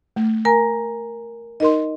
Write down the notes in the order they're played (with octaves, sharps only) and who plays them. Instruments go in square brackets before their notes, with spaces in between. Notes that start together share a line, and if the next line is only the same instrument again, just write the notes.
[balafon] A3
[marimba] A#4 G#5 A#5
[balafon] D#4 A#4 C6 [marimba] D#5